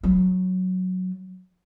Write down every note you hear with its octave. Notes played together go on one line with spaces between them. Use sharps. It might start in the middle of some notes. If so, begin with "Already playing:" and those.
F#3